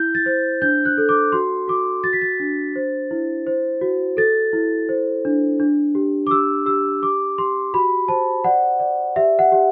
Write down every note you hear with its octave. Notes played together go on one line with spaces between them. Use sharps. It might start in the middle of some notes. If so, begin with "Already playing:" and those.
Already playing: E4 G6
A6
C5
D4 G6
F#6
A4
D6
F#4 C6
F#4 D6
F#4 A6
B6
A6
D4
C5
E4
C5
F#4
A4 A6
E4
C5
D4
D4
G4
D6
G4 E6
G4 E6
G4 D6
G4 C6
F#4 B5
C5 A5
D5 F#5
D5
G4 E5
F#5
G4